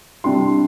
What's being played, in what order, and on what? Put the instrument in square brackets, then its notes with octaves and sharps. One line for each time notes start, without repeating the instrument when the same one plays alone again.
[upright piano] C3 G3 D4 C6